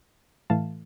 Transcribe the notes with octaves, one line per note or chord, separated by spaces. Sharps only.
A2 E3 A3 F5 A5